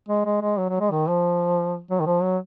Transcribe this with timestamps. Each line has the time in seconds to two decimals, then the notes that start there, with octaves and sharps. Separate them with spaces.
0.09 G#3
0.26 G#3
0.42 G#3
0.58 F#3
0.69 F#3
0.80 G#3
0.91 D#3
1.07 F3
1.91 F#3
2.00 D#3
2.06 F3
2.23 F#3